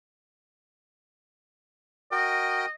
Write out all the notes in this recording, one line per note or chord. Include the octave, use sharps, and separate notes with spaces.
F#4 A#4 D#5 G5